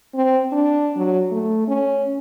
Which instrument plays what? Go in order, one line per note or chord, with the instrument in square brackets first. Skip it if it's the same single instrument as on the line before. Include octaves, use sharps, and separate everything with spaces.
[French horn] C4
D4
F#3
A3
C#4